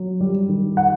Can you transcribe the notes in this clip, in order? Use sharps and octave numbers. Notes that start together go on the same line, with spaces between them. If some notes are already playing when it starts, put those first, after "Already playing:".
Already playing: F#3
G3
D#3
F#5